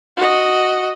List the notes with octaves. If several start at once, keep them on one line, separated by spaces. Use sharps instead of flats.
F#4 D#5